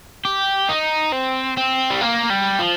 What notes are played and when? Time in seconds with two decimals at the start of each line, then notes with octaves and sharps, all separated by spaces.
0.25 G4
0.69 D#4
1.12 C4
1.57 C4
1.90 G3
2.01 A#3
2.30 G3
2.59 F3